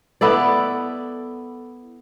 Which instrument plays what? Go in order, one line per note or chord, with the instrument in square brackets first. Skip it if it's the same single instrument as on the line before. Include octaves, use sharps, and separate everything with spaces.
[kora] B3 E4 A4 D5